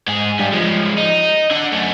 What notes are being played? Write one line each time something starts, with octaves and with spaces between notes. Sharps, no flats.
G#2 G#4
G2 G3
F3 G#3
D#4
D3 F#5
F#2 A3